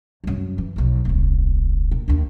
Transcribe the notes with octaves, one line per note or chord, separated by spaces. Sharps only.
C2 F#2
E3
B1 F2
D#1 C2
A#2
D#2 D4